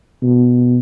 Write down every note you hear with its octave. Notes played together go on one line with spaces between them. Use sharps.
B2